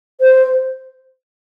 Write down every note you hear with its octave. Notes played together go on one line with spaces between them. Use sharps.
C5